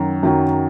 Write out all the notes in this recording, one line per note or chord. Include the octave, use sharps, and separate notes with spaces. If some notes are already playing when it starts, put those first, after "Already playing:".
Already playing: F#2 D#3 F#3
F#2 D#3 F#3